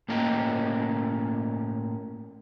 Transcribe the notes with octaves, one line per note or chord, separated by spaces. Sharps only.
A2 A#3 C#4 A#4 D#5 G5